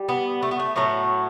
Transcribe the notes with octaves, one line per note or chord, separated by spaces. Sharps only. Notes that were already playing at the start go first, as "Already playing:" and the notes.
Already playing: G3
B3
A3
B3
A3
A2 F#3 A3 B3